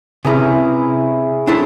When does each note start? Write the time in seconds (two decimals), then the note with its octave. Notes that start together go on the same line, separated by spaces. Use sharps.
0.25 C3 C#4 E4 G#4 B4 A#5
1.47 C4 D4 E4 A4 C#5